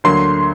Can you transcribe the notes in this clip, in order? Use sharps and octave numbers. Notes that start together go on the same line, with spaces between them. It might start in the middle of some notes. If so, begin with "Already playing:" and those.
D2 D3 F#3 A#3 C6